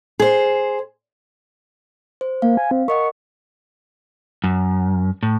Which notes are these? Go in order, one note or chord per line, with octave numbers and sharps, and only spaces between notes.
G#4 C5
C5
A#3 F5
G#5
C4
A#4 D#5 F#5 C#6
F#2
A2